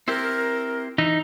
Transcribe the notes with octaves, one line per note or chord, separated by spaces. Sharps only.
C4 E4 G4 A#4
E3 D#4